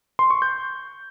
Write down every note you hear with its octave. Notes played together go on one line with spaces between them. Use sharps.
C6
C#6
G6